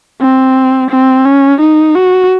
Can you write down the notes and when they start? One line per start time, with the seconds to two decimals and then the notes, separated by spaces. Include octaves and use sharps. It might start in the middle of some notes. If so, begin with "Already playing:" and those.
0.21 C4
0.90 C4
1.25 C#4
1.60 D#4
1.95 F#4